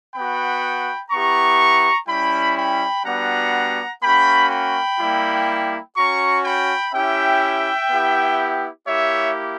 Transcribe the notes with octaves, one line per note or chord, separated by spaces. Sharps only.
B3 F#4 G5 B5
B3 E4 G4 A#5 C#6
G3 C#4 E4 G5 B5
G5 B5
G3 B3 D4 F#4 F#5 A#5
A#3 C#4 F#4 G5 B5
G5 B5
G3 A#3 E4 G4
C#4 F#4 A#5 C#6
G5 B5
C#4 E4 G4 E5 G5
B3 E4 G4
A#3 E4 G4 C#5 E5